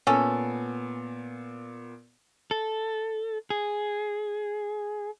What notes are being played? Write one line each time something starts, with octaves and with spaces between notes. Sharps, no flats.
A#2 B3 C#4 A4
A4
G#4